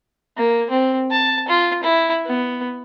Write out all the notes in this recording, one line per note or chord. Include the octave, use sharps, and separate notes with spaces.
A#3
C4
A5
F4
E4
B3